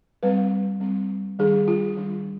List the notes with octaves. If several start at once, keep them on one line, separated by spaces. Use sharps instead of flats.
G3 C4 B4
G3 C4
D#3 G3 D4 G#4
F4
D#3 G3 D4